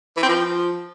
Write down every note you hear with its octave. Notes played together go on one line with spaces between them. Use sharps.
E3
C4
F3